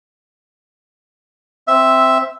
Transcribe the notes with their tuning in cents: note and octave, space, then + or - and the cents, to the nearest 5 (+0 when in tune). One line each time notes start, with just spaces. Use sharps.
C4 +0 E5 +0